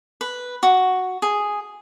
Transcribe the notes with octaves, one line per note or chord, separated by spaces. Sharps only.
B4
F#4
G#4